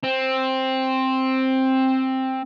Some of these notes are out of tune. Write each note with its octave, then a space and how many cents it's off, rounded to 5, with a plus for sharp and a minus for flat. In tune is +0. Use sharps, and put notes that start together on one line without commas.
C4 +10